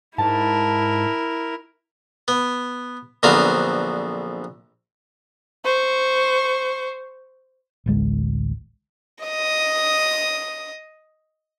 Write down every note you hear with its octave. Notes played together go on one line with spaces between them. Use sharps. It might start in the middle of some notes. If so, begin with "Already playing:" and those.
G#2 E4 A#4 A5
B3
A#1 D3 F#3 B3 C4 F5
C5 C#6
A1 D2 G#3
D#5 D#6